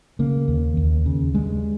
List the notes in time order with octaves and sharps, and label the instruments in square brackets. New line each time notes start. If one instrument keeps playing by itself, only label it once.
[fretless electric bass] C#3 A#3
D#2
D#2
C#3
G2 G#3